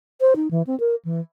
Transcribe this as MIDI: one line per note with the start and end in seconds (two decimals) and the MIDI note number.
0.21 0.34 72
0.36 0.50 63
0.51 0.63 52
0.67 0.78 60
0.80 0.95 70
1.05 1.20 52